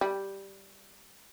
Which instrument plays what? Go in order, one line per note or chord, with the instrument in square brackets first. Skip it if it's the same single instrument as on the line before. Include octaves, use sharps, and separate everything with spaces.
[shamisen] G3